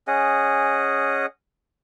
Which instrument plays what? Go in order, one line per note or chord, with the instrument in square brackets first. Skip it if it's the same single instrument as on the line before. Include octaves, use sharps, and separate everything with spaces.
[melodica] C#4 G#4 D#5 F#5